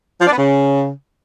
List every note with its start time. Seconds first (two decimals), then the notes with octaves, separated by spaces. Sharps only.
0.21 F3
0.27 D4
0.33 B3
0.38 C#3